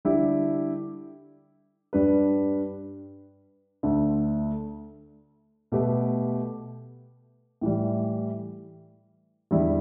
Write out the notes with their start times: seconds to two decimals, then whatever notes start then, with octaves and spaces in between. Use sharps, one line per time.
0.05 D3 G3 E4 G4
1.93 G2 G3 D4 B4
3.83 D2 D3 A3
5.72 B2 A3 G4 B4
7.61 A2 E3 G3
9.51 E2 D3 G3 E4